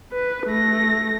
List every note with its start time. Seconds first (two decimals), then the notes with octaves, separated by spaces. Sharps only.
0.13 B4
0.47 A3 A#6